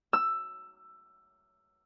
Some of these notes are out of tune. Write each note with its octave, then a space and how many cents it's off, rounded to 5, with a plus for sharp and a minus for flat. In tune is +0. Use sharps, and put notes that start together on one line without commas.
E6 +10